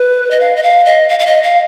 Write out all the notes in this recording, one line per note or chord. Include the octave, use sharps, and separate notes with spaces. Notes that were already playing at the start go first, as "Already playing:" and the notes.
Already playing: B4
D#5
F5
D#5
F5
D#5
F5
F5
D#5
F5